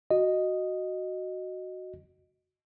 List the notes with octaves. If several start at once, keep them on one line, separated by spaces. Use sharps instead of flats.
F#4 D#5